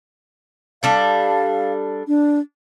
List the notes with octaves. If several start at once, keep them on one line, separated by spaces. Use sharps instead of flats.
G3 D4 A4 F5
D4